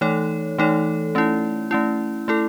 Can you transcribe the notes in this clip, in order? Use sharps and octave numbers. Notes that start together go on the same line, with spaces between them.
E3 A3 D#4 A4 C#5
E3 A3 D#4 A4 C#5
A3 C#4 E4
A3 C#4 E4
A3 E4 A4